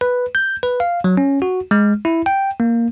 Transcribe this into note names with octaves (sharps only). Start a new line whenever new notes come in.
B4
G6
B4
F5
F#3
C#4
F#4
G#3
E4
G5
A#3